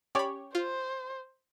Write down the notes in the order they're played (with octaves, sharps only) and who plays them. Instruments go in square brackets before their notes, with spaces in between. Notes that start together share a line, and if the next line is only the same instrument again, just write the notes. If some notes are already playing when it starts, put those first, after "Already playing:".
[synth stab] C#4 G4 C#5 [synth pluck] D5 B5
[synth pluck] F4 [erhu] C5